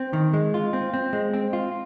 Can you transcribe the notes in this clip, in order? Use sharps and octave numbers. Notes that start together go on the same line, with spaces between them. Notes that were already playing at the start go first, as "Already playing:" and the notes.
Already playing: C4
D#3
G#3
F4
C4
C4
G#3
C4
F4